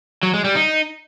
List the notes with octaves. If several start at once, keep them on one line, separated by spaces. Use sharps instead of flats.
F#3
G#3
G3
D#4